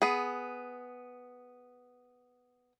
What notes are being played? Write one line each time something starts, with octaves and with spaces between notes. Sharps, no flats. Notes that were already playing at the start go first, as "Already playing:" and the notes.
B3 G#4